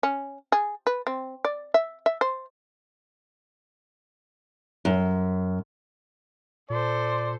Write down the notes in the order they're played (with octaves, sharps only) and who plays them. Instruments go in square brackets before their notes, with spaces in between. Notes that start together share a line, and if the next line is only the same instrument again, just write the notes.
[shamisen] C#4
G#4
B4
C4
D5
E5
E5
C5
[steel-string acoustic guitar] F#2
[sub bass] A#2 [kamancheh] A4 C5 [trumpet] D5